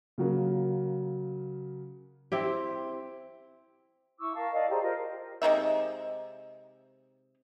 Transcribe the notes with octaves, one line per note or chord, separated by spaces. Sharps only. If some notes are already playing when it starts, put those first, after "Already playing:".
C#3 F#3 A#3
C4 E4 G4
E4 C#6 D6 E6
A#4 F5 A5
D5 D#5 F5 A5
G4 G#4 C5 A#5
F4 A#4 C5 D#5
C3 G#3 D#4 E5